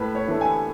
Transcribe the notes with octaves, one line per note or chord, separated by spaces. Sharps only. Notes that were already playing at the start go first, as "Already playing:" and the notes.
Already playing: A2 B4
C#5
E3 A3 D4
G#5